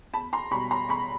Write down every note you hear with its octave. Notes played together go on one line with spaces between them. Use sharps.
E2 A5 B5
A#5 C6
B2 G3 B5 C#6
A#5 C6
E2 B5 C#6